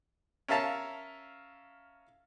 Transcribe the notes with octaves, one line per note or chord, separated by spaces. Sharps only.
C#4 A#4 E5 F5 A5